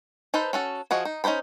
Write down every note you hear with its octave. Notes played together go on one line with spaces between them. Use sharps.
D#4 A4 B4 C5
C#4 F#4 A4
F3 F#4 G#4 D#5
D#4
C#4 D#4 B4 C5 B5